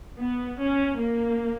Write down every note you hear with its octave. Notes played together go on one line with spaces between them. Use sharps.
B3
C#4
A#3